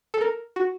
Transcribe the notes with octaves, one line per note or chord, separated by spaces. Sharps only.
A4
A#4
F#4